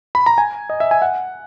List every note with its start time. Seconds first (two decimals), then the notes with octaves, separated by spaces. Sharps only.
0.15 B5
0.26 A#5
0.38 G#5
0.70 D#5
0.80 E5
0.91 G#5
1.02 F#5